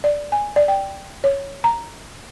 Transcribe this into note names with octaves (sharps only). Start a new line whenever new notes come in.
D5
G#5
D5
G5
C#5
A#5